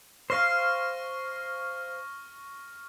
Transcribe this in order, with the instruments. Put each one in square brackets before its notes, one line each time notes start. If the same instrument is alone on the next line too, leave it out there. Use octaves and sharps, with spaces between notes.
[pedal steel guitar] C5 F5 [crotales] C#6 F6 A#6